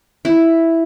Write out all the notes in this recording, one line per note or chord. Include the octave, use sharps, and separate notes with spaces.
E4